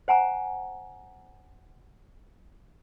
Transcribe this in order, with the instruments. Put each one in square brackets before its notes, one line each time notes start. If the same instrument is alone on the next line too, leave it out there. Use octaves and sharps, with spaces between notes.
[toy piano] C5 F#5 G#5 A#5